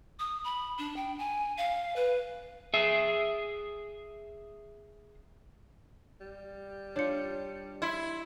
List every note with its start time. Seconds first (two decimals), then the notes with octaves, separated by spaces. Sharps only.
0.19 D#6
0.44 B5
0.79 D4
0.96 G5
1.19 G#5
1.58 F5
1.96 B4
2.74 G#4 E5
6.21 G3
6.96 D4 F4 C#5 G6 C#7
7.82 E4 C6 G#6